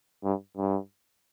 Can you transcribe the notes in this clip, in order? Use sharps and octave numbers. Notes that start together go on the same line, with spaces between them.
G2
G2